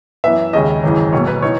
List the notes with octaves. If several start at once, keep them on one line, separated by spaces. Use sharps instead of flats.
F#2 E3 B3 E5
D#2 C#3 G#3 C#4 D#5
G#1 F#2 C#3 E3
B1 B2 A#3 C#5
B4
E3 B3 D#4 C#5